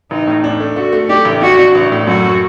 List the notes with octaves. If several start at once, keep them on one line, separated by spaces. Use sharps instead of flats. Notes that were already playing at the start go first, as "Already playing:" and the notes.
A1 D#4
A2
D4
A3
A3 F#4
A3
D4 G4
A1
D4 F#4
D4
A1
A2
F#2 F#4